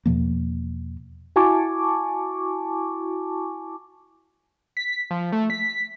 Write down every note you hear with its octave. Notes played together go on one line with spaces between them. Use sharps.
E2 B2 F3 A#3
E4 F#4 G#5 A5 C#6 D6
B6
F3
A3
B6